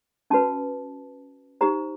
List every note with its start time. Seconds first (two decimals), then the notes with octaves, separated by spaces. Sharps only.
0.30 C#4 F#4 B4 A5
1.61 D#4 G4 C5 A#5